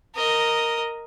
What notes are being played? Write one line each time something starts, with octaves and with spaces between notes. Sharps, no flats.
A#4 D#5